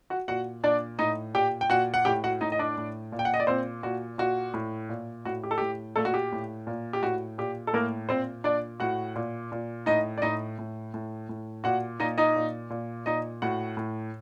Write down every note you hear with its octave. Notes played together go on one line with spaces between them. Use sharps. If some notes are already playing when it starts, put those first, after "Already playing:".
F#4 F#5
A#2 F#4 F#5
A#2 D4 D5
A2 D#4 D#5
A#2 G4 G5
G5
A#2 F#4 F#5
F#5
A2 G4 G5
F#4 F#5
A2 D#4 D#5
D#5
D4 D5
A2
A#2
G5
F#5
D#5
D5
A#2 C4 C5
A#2 F#4
A#2 F#4
A2
A#2
A2 F#4
G4
A4
A2 G4
A#2 A3 A4
F#4
G4
A2
A#2
G4
A2 F#4
A#2 G4
A4
A2 A#3 A#4
A#2 C4 C5
A#2 D4 D5
A2 F#4 F#5
A#2
A#2
A2 D#4 D#5
D5
A2 D#4 D#5
A2
A2
A2
A#2 F#4 F#5
A#2 D#4 D#5
D#4 D#5
A#2
A#2
A#2 D#4 D#5
A2 F#4 F#5
A2